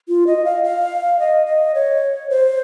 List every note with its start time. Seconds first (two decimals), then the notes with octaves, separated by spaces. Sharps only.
0.08 F4
0.27 D#5
0.45 F5
0.64 F5
1.19 D#5
1.46 D#5
1.75 C#5
2.30 C5